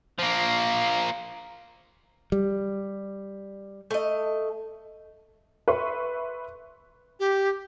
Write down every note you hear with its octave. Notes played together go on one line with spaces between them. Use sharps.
F3 A#3
G3
A3 D#5
B4 E5 C6 C#6
G4